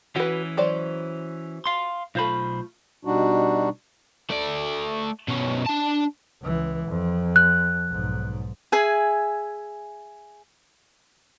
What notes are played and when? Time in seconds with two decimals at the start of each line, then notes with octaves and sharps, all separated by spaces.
0.16 E3 C#4 F#4 B4
0.57 F#3 C5 D5
1.66 F5 C6
2.15 B1 A3 F4 C5 B5
3.05 B2 G3 D4 D#4 F#4
4.30 A3 D5
5.28 B2 C#4
5.67 D4 A5
6.42 C#2 E3
6.89 F2
7.36 F#6
7.88 B1 G#2
8.72 G#4 E5 G#5